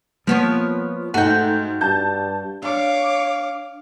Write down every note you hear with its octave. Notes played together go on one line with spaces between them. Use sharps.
F3 G3 A#3 B3 C#5
G#2 A3 D#4 F#4 G5
G2 A5 G6
D4 C#5 F5 D6